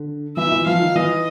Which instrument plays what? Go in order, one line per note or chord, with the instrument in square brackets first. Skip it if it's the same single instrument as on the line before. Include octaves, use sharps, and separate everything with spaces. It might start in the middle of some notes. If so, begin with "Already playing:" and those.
Already playing: [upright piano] D3
[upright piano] E3 E4 [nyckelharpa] E5
[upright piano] D#4
E3 E4
[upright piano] F3 F4 [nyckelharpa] F5
[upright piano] D#3 D#4
[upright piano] E3 E4 [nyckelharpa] D#5